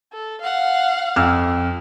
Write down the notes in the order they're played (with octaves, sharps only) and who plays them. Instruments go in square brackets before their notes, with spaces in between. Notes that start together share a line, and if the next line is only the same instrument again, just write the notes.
[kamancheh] A4
F5 F#5
[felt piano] F2 E6 F6